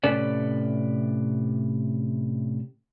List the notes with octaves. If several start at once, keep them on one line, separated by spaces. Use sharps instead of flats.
A2 C3 C#4 A4 B4 D5